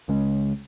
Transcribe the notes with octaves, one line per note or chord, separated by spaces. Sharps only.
C#2 C#3 G#3 C#4